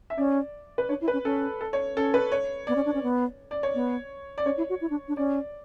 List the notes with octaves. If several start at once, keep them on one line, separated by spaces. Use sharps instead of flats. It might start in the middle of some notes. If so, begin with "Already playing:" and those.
E5
C#4 D5
B4
D4 C#5
E4
B4
C#4
C#4 A4
A4
C#5
C#4 A4
B4
C#5
B3 D5
C#4
D4
C#4
B3
D5
C#5
B3
D5
C#4 C#5
E4
F#4
E4
D4
D4
C#4 D5